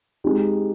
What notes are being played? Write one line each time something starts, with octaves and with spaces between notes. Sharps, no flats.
G#3 C4 D#4 G4